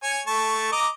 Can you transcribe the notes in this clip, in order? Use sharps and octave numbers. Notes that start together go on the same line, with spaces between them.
C#5 G#5
A3 A5 C#6
D#5 A#5 D6